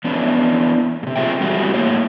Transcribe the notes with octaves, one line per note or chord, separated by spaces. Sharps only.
E3 B3 C#4 D4
G#2 C3
C4 F4 G#4 E5 G5
G#2 E3 G3 F#4 G#4
A2 A#3 C#5